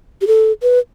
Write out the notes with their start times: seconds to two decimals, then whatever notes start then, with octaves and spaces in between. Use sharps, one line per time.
0.21 G4
0.27 A4
0.62 B4